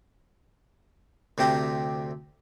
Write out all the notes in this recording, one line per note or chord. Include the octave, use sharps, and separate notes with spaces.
D2 C3 C4 G4 A#5